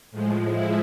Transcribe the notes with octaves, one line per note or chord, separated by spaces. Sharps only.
A2 F3 G#3
E4